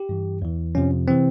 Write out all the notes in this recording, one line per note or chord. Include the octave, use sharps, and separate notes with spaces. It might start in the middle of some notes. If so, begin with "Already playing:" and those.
Already playing: G4
G2 E3
E2 E3
F2 C3 F3 C#4
C3 E3 C4